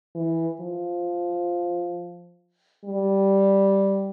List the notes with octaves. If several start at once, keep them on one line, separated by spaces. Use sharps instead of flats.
E3
F3
G3